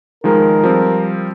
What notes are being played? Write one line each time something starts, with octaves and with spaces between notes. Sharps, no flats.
D#3 F3 G#3 A#4
F3 G3 C4